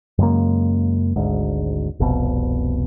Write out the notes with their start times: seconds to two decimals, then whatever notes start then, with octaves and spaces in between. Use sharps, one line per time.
0.18 F#2 C#3 G#3 A#3
1.16 G#1 D2 G#2
2.00 F1 C2 B2